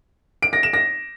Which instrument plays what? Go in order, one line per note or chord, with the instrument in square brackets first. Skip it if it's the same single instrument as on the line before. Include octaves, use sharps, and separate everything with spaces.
[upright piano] D7
A#6
E7
A#6